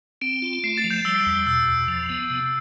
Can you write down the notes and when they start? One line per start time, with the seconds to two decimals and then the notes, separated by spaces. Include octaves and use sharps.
0.22 C4 D7
0.42 F4
0.64 A3 C7
0.78 A6
0.84 F3
0.90 G6
1.05 G3 E6
1.26 E2
1.47 B2 E6
1.68 E2
1.88 F3
2.10 B3
2.30 C3